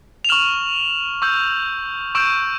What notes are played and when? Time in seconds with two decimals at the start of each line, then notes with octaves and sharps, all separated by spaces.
0.25 F7
0.29 C#6 F6 E7 F#7
1.22 C#6 E6 G6
2.15 C#6 E6 G6 D7 E7